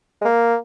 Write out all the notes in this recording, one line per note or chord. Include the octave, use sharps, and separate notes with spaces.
G#3
A#3